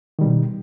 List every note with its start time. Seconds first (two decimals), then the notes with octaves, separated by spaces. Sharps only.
0.19 D#3
0.21 G3
0.24 B2